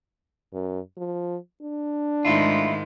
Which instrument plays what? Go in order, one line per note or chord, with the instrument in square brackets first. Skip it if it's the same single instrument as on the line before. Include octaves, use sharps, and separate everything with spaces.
[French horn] F#2
F3
D4
[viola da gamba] G#2 D#3 G#3 [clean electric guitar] A3 E4 F4